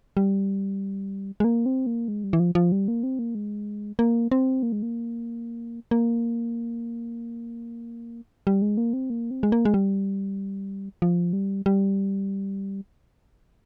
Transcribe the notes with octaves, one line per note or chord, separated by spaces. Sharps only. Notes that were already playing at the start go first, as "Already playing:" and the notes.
G3
G#3
A#3
C4
A#3
G#3
G3
E3
F3
F3
G3
A#3
C4
A#3
G#3
A#3
C4
A#3
G#3
A#3
A#3
G3
G#3
A#3
C4
A#3
C4
G#3
A#3
G#3
G3
F3
G3
G3